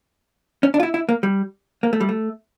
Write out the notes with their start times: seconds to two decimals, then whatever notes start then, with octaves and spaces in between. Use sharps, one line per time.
0.63 C#4
0.74 D4
0.80 F4
0.83 E4
0.94 E4
1.09 A#3
1.23 G3
1.83 A#3
1.93 A3
2.01 G3
2.09 A3